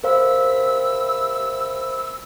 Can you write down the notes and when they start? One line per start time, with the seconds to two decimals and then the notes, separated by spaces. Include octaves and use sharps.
0.04 C3 A#4 C5 F5 B5 E6